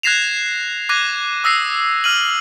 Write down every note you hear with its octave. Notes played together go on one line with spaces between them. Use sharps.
F#6 G#6 A#6 C7 E7 F7
D6 F#6 G#6 A#6 D#7
D#6 E6 A#6 C7
F6 D#7 F#7